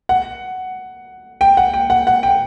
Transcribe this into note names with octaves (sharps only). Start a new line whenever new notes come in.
F#5
G5
F#5
G5
F#5
F#5
G5